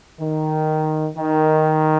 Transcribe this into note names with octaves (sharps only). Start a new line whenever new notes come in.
D#3
D#3